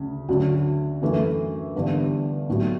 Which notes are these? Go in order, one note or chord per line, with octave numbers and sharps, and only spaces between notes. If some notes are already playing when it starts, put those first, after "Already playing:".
Already playing: D2 C#3
D2 D3 F#3 C#4 F#4
F#2 E3 A3
G1 G2 E3
B1 A2 F#3